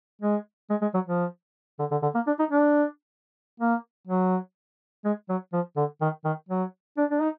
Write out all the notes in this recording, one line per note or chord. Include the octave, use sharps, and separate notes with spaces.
G#3
G#3
G#3
F#3
F3
D3
D3
D3
A#3
D4
D#4
D4
A#3
F#3
G#3
F#3
F3
D3
D#3
D#3
F#3
D4
D4
D#4